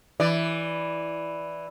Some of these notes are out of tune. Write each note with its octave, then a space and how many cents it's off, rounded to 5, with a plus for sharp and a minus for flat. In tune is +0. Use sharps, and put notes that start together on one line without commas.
E3 +0 D5 +0